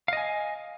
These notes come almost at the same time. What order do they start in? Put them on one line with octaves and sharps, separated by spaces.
F5 D#5 G#5